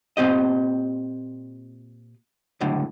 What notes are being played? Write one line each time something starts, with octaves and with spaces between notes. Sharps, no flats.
A#2 C4 G4 D#5
C#2 F#2 A2 D3